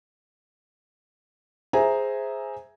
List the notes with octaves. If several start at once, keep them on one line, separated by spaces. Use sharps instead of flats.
G#4 C5 E5 G#5 A#5